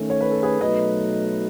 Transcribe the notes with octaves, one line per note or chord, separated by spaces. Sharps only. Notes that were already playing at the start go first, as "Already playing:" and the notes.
Already playing: D#3 A3 C#4
C#5
B4
A4
G#4 B4
B2 F#3 A3 D#4 B4 D#5